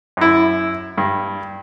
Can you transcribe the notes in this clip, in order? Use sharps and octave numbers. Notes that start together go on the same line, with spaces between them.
F#2 E4
G2